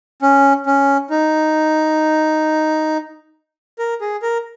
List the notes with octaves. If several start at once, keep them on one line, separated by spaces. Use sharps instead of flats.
C#4
C#4
D#4
A#4
G#4
A#4